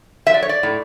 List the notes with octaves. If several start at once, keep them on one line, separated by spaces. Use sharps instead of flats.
F#3 E5
D5
C#5
D5
A2